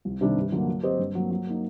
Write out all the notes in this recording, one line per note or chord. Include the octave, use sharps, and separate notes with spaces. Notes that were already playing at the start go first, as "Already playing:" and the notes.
C2
C3 D#3 G3 D4
G2
D3 F#3 A#3
F#3
C4 G4 C5 D#5
G2
F#3 A#3
F#3
A#3 D#4